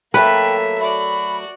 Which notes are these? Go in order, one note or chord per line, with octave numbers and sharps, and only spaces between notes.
F#3 A3 A#3 A4 B4 E5 G5
F#4 D5 B5